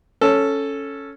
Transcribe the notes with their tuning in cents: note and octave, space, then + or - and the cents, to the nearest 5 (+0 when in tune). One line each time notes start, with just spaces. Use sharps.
C#4 +0 A4 +0